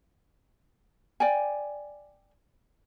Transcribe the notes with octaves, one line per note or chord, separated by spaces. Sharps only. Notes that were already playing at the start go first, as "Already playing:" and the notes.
D5 G5 G#5